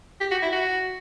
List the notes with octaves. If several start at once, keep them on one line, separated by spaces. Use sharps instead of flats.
G4
F#4
E4
F#4